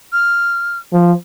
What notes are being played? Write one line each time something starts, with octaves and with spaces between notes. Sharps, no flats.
F6
F3